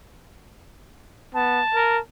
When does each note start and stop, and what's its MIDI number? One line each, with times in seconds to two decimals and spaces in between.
1.34 1.61 59
1.34 2.00 81
1.74 1.99 70